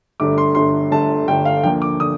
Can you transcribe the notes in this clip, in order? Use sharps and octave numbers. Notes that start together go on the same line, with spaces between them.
G1 G2 D3 A3 D6
C6
G1 G2 D3 A3 C6
G1 G2 D3 A3 A5
G1 G2 D3 A3 G5
F5
D2 D3 F3 A#3 G5
D6
D3 D#6